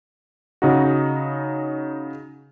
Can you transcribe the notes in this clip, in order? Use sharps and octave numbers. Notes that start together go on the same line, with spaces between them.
C#3 D#4 F#4